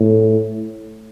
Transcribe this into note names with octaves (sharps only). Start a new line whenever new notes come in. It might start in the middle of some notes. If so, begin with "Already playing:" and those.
Already playing: A2